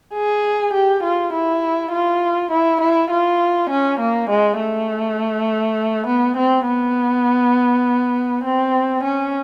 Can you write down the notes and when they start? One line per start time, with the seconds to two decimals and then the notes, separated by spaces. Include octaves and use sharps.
0.14 G#4
0.73 G4
1.03 F4
1.33 E4
1.92 F4
2.51 E4
2.81 E4
3.10 F4
3.70 C#4
4.00 A#3
4.30 G#3
4.59 A3
6.07 B3
6.37 C4
6.67 B3
8.45 C4
9.04 C#4